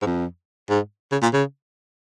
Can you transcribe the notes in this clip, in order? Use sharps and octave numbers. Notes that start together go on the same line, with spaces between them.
G#2
F2
G#2
C#3
A#2
C#3